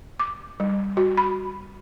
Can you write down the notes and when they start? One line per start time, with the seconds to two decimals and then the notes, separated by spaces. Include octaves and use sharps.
0.20 D6
0.60 G3
0.97 F#4
1.17 B5